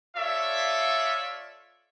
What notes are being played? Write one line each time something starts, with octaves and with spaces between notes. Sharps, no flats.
F4 A4 C#5 D5 E5